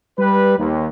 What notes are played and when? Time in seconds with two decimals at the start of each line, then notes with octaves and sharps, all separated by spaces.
0.19 G3 B4
0.59 D#2